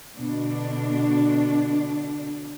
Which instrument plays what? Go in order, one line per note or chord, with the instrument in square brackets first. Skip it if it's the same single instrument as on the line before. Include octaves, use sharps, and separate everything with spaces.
[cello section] B2 D3 D4